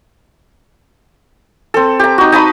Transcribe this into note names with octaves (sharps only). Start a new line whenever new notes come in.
C4 A4
G4 A#5
D#4 F#4
D#4 A5 B5 D#6